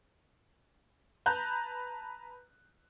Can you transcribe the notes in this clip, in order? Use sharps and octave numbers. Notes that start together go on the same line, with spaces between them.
B4 A5 A#5 F#6 G6